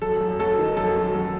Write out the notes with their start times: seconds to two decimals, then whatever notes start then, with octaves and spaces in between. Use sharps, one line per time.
0.02 F#2 A4
0.21 F#2
0.39 F#3 A4
0.58 D#3
0.77 F#2 A4
0.96 F#2
1.15 F#3